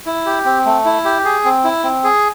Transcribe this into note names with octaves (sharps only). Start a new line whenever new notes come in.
E4
G4
C4
A3
E4
G4
G#4
C4
E4
C4
G#4